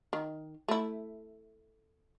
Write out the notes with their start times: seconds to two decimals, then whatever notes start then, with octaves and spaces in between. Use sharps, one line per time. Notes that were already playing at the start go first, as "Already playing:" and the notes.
0.13 D#3
0.68 A3 E4